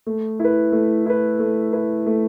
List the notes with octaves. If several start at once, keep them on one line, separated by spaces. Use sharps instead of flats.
A3
E4 B4
A3
E4 B4
A3
E4 B4
A3